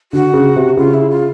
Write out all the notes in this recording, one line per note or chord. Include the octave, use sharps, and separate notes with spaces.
D3 F#4
C#3
C3
C#3 F4
E4
F4